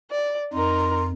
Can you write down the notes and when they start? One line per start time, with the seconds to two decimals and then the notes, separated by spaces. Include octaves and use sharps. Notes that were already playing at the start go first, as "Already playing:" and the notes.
0.11 D5
0.53 F2 D#4 A#4 C6